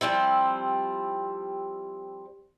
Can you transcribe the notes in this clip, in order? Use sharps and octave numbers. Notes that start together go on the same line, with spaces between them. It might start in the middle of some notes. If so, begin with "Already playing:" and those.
F3 G3 C4 E4